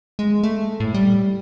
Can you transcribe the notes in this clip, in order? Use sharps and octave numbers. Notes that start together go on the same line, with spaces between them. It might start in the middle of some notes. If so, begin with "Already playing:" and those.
G#3
A3
A2
G3